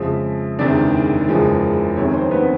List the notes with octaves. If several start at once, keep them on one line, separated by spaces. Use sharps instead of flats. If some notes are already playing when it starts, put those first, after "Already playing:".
Already playing: F2 C#3 F3 G#3 E5
F#1 E2 C3 D#3 G#3 D4 D5
F#1 E2 C#3 F3 G#3
F1 F2 C3 D#3 C#4 C#5
C4 C5
B3 B4